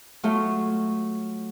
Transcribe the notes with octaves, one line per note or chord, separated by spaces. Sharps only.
F#3 A3 F4